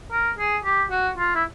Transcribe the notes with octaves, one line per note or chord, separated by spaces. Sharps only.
A#4
G#4
G4
F#4
F4
E4